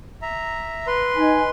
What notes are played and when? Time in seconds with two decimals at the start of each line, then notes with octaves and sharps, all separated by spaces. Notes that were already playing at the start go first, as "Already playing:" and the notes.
0.22 E5 A#5
0.87 B4 C6
1.16 D#4 G#5